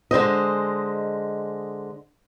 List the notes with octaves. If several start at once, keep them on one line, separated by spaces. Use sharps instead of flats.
D3 G#3 C5 D#5